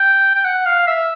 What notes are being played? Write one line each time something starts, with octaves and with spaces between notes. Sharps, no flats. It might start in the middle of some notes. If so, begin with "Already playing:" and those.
Already playing: G5
G5
F#5
F5
E5